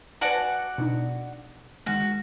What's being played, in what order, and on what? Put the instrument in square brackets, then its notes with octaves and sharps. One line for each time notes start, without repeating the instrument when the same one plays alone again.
[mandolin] F#4 D5 F#5 [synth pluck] B4 G#5 A5
[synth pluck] B2 D4 D#4
[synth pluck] D#3 G#3 [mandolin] F#4